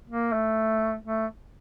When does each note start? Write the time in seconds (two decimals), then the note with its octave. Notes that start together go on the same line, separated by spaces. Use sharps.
0.10 A#3
0.33 A3
1.05 A3